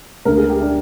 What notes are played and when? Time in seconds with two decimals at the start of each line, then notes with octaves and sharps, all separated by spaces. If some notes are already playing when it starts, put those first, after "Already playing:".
0.25 D2 D3 G#3 A#4
0.37 G#4
0.50 G4
0.61 D4